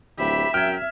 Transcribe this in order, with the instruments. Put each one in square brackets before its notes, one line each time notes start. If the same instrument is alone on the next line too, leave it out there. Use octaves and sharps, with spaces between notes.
[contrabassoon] D1 [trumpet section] G4 B5 [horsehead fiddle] E5
[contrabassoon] F#2 [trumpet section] A#4 G5 [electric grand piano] F6 G#6